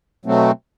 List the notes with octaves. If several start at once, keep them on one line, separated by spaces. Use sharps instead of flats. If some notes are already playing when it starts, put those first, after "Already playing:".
B2 F#3 A3 C4